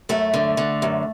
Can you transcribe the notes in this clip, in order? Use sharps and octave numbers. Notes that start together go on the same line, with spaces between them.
F#2 A3
D3
D3
F#2